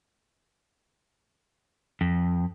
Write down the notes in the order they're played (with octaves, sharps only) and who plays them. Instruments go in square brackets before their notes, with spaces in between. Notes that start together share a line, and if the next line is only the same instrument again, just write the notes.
[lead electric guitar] F2